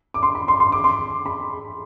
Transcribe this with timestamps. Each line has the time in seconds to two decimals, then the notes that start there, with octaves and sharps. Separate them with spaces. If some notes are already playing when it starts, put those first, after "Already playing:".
0.14 D6
0.23 C6
0.35 B5
0.48 C6
0.60 C6
0.72 D6
0.84 C6
1.26 B5